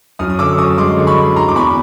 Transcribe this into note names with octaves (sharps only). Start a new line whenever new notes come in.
F#2 D#6 F6
D#6
D3 D6 E6
F#2 C#6 D#6
G#3 C6 D6
D3
B5 C#6
G#3
E3 A#5 C6
D6
E2 B5 C#6